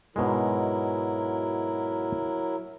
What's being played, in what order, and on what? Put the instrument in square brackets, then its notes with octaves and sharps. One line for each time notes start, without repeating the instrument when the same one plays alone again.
[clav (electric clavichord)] G#2 B2 G#3 [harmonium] F#3 E4 A#4